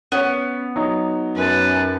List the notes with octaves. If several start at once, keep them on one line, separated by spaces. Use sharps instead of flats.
B3 C#4 C#5
F#3 D#4
F#2 B4 A5